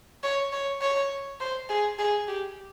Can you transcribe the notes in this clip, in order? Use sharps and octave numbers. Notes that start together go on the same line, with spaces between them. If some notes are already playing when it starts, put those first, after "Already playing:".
C#5
C#5
C#5
C5
G#4
G#4
G4